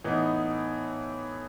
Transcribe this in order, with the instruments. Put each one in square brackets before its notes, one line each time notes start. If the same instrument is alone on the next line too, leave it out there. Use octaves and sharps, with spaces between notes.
[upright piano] A2 E3 B3 D#4